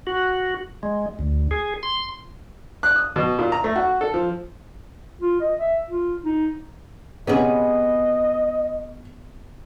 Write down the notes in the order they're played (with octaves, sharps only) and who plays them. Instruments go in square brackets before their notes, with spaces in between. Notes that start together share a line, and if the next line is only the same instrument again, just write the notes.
[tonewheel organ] F#4
G#3
D2
G#4
C6
[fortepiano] F#6
D#6
B2
A#2
A#5
A3
F#4
A4
F3
[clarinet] F4
D#5
E5
F4
D#4
[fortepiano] C3 C#4 [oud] B3 G#4 [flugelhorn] D#5